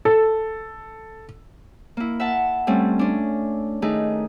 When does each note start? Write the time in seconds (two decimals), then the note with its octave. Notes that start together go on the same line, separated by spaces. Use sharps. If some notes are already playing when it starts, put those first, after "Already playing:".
0.05 A4
1.97 A#3 E4
2.20 E5 F#5 A5
2.67 G3 A3 C4 C#4
2.99 C#4 D4
3.82 D#3 A3 D#4 G#4